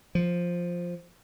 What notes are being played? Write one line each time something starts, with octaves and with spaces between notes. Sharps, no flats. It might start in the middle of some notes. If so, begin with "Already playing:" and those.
F3